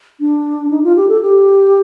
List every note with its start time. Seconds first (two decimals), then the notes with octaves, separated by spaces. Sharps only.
0.20 D4
0.71 D#4
0.83 F4
0.96 G4
1.08 A4
1.22 G4